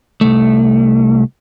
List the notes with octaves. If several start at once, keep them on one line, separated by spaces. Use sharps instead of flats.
C2 A3